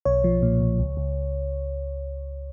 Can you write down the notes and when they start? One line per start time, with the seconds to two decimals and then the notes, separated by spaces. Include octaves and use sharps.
0.05 B1 C#5
0.24 F3
0.42 A#2
0.61 B1
0.79 C#2
0.97 C#2